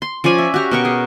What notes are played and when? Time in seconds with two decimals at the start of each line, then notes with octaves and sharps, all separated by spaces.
0.02 C6
0.24 F3 C#4 D5 G#5
0.38 E5
0.54 F#4 G4 A#5
0.71 B2 A#4 C#6
0.85 G#4